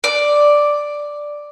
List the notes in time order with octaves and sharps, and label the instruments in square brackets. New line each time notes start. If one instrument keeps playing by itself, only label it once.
[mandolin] D5